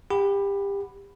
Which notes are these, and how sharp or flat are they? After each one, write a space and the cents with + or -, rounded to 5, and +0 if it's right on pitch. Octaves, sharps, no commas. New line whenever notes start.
G4 +25 F#5 +0 B5 +0